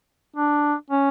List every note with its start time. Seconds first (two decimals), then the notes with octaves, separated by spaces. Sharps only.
0.36 D4
0.90 C#4